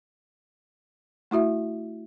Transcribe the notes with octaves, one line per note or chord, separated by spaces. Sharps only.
A3 E4 F#4 E5